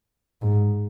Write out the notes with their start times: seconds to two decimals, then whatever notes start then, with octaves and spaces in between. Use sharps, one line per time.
0.42 G#2